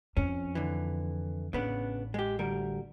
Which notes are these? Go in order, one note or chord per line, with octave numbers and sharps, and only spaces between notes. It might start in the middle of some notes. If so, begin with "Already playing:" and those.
F2 C#4
D3 E3
A1 C#3 B3 D4
G#3 G4
D2 G3 A#4